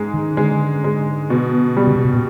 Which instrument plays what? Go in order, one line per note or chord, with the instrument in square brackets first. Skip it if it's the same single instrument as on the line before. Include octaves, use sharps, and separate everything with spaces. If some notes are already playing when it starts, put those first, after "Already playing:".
Already playing: [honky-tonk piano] G#2 G#3
[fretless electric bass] D#3
[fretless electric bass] D3 [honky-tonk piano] G#3
[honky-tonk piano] G#3
B2
G3
[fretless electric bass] C#3
C3
B2
A#2